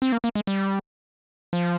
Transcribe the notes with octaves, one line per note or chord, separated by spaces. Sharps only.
C4
A#3
A#3
G#3
G3
F3